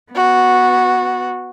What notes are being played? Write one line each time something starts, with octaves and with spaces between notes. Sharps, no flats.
B3 F#4